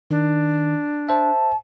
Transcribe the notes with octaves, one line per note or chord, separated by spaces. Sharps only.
D#3 D4
C5 E5 A5